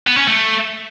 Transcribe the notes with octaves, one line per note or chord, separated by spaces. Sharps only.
B3
C#4
A3